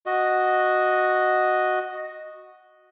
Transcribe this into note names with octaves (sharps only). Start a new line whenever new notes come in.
F#4 D#5